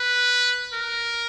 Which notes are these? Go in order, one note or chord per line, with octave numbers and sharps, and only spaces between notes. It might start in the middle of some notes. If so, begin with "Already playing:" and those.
Already playing: B4
A#4